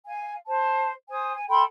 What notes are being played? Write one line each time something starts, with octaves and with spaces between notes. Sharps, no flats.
F5 G#5
C5 A5
C5 G#5 D#6
G#5
A4 G5 B5 C6